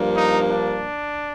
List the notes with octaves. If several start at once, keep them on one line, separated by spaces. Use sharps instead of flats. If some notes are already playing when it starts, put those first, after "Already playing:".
Already playing: G2 F3 A#3 D4
D#4
D4